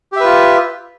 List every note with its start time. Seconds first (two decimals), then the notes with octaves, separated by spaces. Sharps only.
0.12 G4
0.16 E5
0.20 B4
0.25 F4